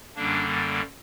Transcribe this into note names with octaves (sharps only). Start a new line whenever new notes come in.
F#2 D3 G3 A#3 D4